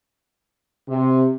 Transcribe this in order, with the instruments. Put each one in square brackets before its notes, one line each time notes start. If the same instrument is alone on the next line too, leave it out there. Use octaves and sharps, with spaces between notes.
[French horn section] C3